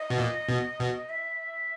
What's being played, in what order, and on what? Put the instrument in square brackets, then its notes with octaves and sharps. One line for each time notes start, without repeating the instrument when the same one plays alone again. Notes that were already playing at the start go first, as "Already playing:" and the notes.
Already playing: [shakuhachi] D#5
[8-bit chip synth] B2
A#2
B2
B2
[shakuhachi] E5